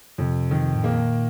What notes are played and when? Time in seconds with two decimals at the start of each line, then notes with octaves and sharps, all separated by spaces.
0.18 F2 C3
0.51 D#3
0.75 A2
0.84 A#2 A#3